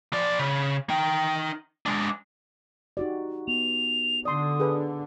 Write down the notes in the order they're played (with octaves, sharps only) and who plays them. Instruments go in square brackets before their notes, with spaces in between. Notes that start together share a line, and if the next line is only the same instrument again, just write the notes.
[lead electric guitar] F3 D5
C#3
D#4 G5
G#3 D4
[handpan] D#4 F#4 G4 [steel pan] D5
[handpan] B3 [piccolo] F7
[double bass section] D3 [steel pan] D5 C6 [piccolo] D#6
[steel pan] G#4 B4